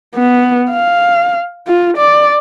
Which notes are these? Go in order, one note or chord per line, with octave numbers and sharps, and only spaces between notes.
B3
F5
F4
D5